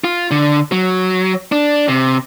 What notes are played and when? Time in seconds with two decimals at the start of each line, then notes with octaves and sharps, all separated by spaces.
0.04 F4
0.31 D3
0.72 F#3
1.52 D4
1.88 C3